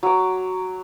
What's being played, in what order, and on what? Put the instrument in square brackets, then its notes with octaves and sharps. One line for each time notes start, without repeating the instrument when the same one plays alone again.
[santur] F#3 D6